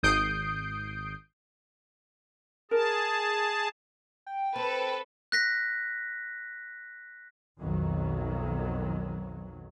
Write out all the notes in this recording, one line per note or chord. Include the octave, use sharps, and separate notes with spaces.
G#1 D#6 G6 C7 D7
G#4 A#4 A5
G5
C4 A4 B4
F#6 A#6 B6
B1 F2 D#3 F#3